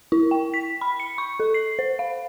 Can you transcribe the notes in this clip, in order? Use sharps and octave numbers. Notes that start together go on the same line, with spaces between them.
E4
G5
B6
B5
C#7
C#6
A4
C7
C5
F5